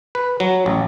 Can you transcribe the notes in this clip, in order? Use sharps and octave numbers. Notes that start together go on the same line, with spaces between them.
B4
F#3
A1